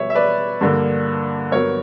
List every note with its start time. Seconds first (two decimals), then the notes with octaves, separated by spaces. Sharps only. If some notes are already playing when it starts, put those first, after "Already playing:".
Already playing: B2 G3 B3 C#5 E5
0.10 E5
0.15 B4 D5
0.61 G2 D3 A#3
1.52 G2 F#3 B3 A#4 C#5